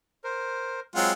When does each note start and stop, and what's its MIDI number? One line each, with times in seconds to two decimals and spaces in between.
0.24 0.80 70
0.24 0.80 72
0.96 1.12 54
0.96 1.12 56
0.96 1.12 60
0.96 1.12 65
0.96 1.12 78